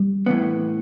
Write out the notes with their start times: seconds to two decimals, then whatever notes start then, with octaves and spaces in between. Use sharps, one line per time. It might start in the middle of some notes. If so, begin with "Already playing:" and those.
Already playing: G3
0.26 A2 E3 B3